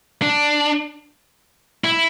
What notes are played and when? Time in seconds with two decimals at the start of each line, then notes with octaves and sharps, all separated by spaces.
0.22 D4
1.84 E4